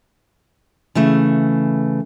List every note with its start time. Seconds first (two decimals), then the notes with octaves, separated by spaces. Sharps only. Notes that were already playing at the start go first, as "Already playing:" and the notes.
0.95 C#3 E3 A3